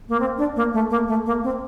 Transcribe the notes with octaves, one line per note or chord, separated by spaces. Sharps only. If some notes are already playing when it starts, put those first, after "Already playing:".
A#3
C4
D4
A#3
A3
A#3
A3
A#3
C4